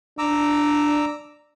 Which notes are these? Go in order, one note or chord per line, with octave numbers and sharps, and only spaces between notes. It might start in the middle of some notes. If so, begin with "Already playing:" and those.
D4 A#5 D6 E6